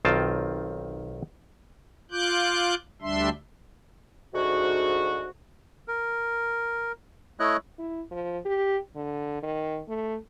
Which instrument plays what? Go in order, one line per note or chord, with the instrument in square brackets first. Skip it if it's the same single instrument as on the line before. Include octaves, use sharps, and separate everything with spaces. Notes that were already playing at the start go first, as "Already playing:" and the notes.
[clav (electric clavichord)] B1 D#3 C4 F4 G5 A5
[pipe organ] F4 D6 F#6 G6
D2 G3 D4 E5 C6
[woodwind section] D2 G#2 F#4
[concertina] A#4
A3 E4 C#5 D#5 F#6
[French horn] E4
F3
G4
D3
D#3
A3